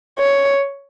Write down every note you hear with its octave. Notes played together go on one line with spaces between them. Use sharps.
C#5